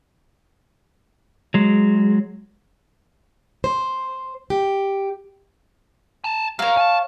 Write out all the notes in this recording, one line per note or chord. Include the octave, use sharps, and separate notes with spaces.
F#3 G#3
C5
G4
G#5 A5
F#3 A#4 C#5 F5
G#5 A5